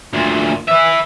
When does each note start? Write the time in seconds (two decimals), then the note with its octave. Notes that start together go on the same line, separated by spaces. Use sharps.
0.13 D2 A#2
0.68 B4 E5